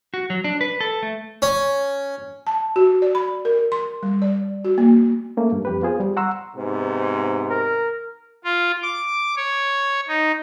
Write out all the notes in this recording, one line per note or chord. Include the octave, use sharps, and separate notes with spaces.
F#4
F#3
D4
B4
A4
A3
C#4
A5
F#4
D5
B5
A#4
C6
G3
D5
F#4
A#3
A3 A#3 C#4
G2
F2 G4 B4
B3 F4 G#4 C5
G3
F#5 A#5 C6 C#6 E6
G#2 C3 B3
A#4
F4
D6
C#5
D#4